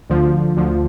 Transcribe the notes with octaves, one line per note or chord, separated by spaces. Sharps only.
D2 D3 F3
D2 D3 F3